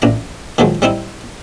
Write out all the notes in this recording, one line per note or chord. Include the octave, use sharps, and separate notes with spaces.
A1 D4 A#5
D#3 F3 F#3 G#3
G3 C4 D#4 E4